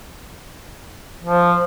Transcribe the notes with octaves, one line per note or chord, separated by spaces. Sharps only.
F3